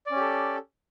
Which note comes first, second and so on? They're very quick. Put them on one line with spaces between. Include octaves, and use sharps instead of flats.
D5 C#4 G4 A4